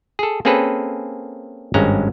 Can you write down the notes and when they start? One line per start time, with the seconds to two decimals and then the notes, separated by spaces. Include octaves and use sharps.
0.19 G#4 A4
0.45 A#3 C4 C#4 G#4 A4 B4
1.74 G#1 G2 G#3 C#4 A#5